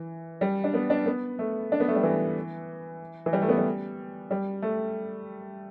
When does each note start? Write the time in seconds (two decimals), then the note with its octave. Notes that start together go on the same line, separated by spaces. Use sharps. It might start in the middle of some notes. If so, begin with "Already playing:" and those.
Already playing: E3
0.41 G3
0.64 D4
0.74 B3
0.90 D4
1.06 B3
1.39 A3
1.72 D4
1.80 B3
1.88 A3
1.96 G3
2.03 E3
3.26 E3
3.33 G3
3.42 A3
3.49 B3
3.58 G3
4.31 G3
4.62 A3